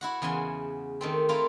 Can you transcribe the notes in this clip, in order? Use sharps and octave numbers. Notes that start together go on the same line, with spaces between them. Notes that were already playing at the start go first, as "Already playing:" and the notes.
E4 F#4 F#5
E2 C#3 F#5 G#5 C6
D#3 A3 C4
A3 C4 E4 F4 A#4 F5